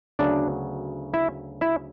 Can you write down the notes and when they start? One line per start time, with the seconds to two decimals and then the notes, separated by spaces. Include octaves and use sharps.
0.19 D2 C#3 F#3 B3 D4 D5
1.14 E4 E5
1.61 E4 E5